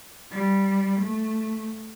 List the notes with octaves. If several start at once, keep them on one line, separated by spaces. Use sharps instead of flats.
G3
A3